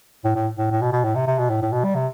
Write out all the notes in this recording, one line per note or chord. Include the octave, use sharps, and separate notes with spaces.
A2
A2
A2
A2
B2
B2
A2
C3
C3
B2
A2
A2
B2
G3
C3